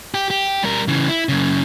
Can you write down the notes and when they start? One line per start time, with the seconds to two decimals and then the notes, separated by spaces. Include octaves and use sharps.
0.14 G4
0.30 G4
0.63 G3 A#4
0.88 C#3 E3
1.09 E4
1.29 F#2 C#3